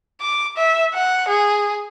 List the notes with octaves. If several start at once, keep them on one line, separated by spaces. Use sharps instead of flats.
D6
E5
F#5
G#4